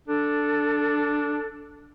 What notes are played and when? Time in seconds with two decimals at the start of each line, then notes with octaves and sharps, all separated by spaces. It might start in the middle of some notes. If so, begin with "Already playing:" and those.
0.08 D4 A4